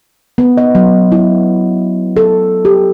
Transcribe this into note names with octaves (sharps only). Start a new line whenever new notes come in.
B3
D#5
F#3
E4
A4
G4